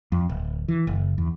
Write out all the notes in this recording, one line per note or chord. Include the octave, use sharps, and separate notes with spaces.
F2
D1
E3
F#1
E2